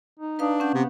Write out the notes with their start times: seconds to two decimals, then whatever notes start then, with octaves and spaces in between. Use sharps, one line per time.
0.19 D#4
0.39 D4 B4 F5 D#6
0.60 C#4 F#5 G6
0.74 C3 B3